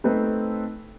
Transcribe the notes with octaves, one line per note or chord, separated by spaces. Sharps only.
A3 C4 D#4 A4 B4 C5